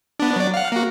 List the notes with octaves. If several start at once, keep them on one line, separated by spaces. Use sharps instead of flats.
B3 D4
F#3 D5
F5 F#5
A#3 F#4